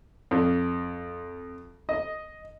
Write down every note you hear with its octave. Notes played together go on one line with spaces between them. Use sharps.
F2
D#5